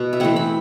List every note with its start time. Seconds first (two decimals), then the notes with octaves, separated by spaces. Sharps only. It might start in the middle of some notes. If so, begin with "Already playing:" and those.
Already playing: B2
0.13 E5
0.20 E3 A3 C4 F#5
0.36 B5